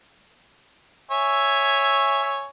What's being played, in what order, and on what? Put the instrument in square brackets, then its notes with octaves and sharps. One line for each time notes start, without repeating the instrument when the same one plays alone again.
[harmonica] C#5 E5 G#5